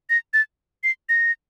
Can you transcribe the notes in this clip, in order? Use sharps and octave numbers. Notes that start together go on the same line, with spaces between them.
A#6
A6
C7
A#6